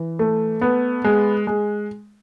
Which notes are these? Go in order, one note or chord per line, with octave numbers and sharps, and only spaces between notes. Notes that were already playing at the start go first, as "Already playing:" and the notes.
Already playing: E3
A3
B3
G#3
G#3